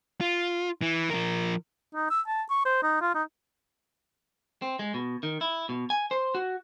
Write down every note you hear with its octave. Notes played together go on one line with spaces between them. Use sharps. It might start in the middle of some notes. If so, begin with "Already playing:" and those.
F4
E3
F3 A#4
D#4
E6
A5
C#6
C5
D#4
F4
D#4
C4
G#3
B2
D#3
E4
B2
G#5
C5
F#4